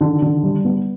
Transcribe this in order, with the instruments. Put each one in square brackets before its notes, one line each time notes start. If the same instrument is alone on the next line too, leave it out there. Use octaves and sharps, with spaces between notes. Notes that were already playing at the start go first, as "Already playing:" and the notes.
[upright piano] D3
D3
G3
B3